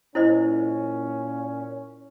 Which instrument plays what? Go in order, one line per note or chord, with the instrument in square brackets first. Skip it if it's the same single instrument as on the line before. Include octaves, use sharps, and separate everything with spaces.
[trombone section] A#2 C#4 [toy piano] E4 C5 D#5